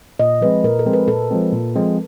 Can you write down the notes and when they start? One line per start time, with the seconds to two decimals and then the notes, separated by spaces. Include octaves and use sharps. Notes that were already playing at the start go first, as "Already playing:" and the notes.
0.19 A#2 D#5
0.41 F3 G#3 C4 B4
0.64 A#2 A#4
0.79 A4
0.86 F3 G#3 C4
0.93 B4
1.08 A#2 A4
1.31 F3 G#3 C4
1.52 A#2
1.76 F3 G#3 C4